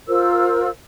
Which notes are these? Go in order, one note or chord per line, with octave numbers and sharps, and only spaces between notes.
F4 A#4 C5 E6